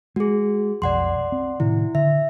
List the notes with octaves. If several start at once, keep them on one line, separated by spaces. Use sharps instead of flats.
G#3 F#4 G#4
B1 F2 D5 F#5 C6
C4
A2 C3 D#3 E4
D3 E5